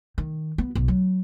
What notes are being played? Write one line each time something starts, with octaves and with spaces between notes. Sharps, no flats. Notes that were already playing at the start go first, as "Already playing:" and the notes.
D#3
B3
B1
F#3